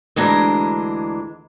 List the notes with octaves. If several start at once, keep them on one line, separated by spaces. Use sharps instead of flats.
D2 E3 G#3 D4 A#5